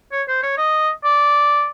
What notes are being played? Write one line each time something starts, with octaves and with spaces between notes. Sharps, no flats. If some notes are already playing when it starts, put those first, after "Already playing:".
C#5
C5
C#5
D#5
D5